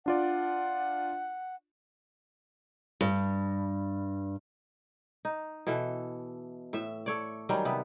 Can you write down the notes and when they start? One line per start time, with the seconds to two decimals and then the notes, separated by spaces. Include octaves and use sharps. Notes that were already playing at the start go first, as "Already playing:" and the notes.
0.06 D4 F4 D5 F#5
3.01 G2
5.25 D#4
5.67 B2 E3 A4
6.73 A2 E5
7.06 A4 C#5 D5
7.49 D#3 F#3 G3 C#4
7.65 C3 B3